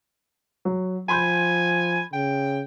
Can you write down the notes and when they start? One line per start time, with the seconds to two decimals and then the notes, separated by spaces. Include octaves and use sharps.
0.65 F#3
1.09 F3 G#5 B5 C6 G6
2.13 C#3 G5